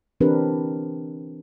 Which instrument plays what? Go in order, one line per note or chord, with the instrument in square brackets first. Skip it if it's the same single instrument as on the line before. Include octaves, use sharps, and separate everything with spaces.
[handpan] E3 C4 D4 G4 A#4 B4